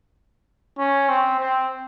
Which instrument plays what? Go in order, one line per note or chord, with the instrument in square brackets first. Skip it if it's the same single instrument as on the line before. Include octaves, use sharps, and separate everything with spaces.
[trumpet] C#4
C4
C4